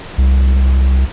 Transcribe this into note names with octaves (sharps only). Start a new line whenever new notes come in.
C2